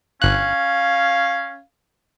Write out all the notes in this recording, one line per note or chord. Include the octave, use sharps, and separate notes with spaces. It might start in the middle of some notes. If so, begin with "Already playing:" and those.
G1 C#4 F5 F#6